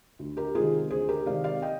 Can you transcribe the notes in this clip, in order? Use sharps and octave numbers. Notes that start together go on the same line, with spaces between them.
D2
G4 A#4
C3 D#3 G#3 C4 F4 G#4
D2 G#4 C5
G4 A#4
C3 D#3 G#3 C4 D5 F5
D5 F5
D#5 G5